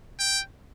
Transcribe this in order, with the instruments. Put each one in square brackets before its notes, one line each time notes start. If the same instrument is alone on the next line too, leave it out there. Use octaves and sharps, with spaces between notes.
[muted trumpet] G5